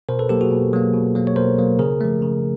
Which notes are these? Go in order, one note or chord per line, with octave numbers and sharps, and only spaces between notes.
B2 A#4 C5
A4 B4
F#3 A#3 G4 A4
F#4 G#4
B2
F#3 A#3
B2
F#3 A#3
C#5
B2 A#4 C5
F#3 A#3
C#3 G#4 A#4
F3 A3
C#3